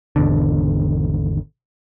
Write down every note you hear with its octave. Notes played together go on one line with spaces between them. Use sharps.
G#1 E2 B2 D3